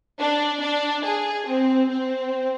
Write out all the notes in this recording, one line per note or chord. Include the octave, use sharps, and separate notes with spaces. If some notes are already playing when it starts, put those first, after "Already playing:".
D4
D4
G#4
C4
C4